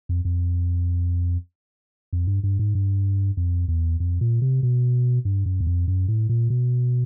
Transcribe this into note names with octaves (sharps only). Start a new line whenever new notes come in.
F2
F2
F2
G2
G2
G#2
G2
F2
E2
F2
A#2
C3
B2
G2
F#2
E2
F2
F#2
A2
A#2
B2